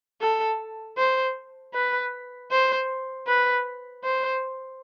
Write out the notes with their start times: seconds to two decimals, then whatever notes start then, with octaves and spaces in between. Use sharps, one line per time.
0.21 A4
0.98 C5
1.74 B4
2.51 C5
3.27 B4
4.04 C5